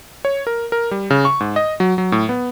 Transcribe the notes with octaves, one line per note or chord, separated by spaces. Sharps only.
C#5
A#4
A#4
G3
C#3
C#6
G#2
D#5
F#3
F#3
A2
B3